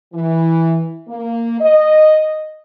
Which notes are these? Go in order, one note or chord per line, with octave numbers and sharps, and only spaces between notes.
E3
A#3
D#5